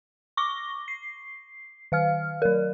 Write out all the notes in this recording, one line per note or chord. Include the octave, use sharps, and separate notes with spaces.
C#6 D6 A#6 G7
C7
D#3 F5 F6
F#3 A#4